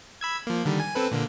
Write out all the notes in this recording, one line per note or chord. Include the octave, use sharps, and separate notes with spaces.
B5 E6 G#6
F3 A#3
D3 D#3 G3
G#5
C4 A4 B4
A#2 D3 A#3